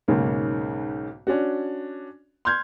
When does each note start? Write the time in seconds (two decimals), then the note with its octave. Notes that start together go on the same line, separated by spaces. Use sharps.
0.08 B1 G#2 C#3 A#3
1.27 C#4 D4 F#4
2.45 C6 F6 G6 G#6